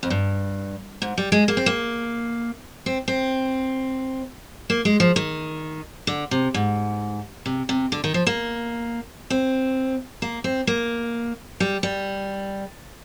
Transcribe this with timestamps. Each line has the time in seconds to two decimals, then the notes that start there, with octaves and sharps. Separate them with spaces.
0.03 F2
0.10 G2
1.02 G#2
1.18 G3
1.32 G#3
1.48 A#3
1.57 C4
1.66 A#3
2.86 C4
3.08 C4
4.70 A#3
4.85 G#3
5.00 F3
5.16 D#3
6.07 D3
6.31 C3
6.54 G#2
7.46 C3
7.69 C3
7.92 D3
8.04 D#3
8.14 F3
8.27 A#3
9.30 C4
10.22 A#3
10.44 C4
10.67 A#3
11.60 G3
11.83 G3